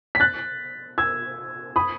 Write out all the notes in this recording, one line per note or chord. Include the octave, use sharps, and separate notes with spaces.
B6
F#6 A6
E6 G#6
B5 D#6